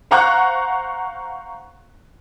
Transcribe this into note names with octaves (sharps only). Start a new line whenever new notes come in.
C5 F5 F#5 A#5 C#6 F#6